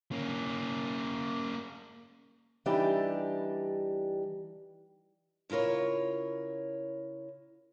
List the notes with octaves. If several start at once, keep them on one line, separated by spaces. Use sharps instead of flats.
A#3 C#4
E3 G3 D4 D#4 G4
C#3 E4 F4 A#4 C#5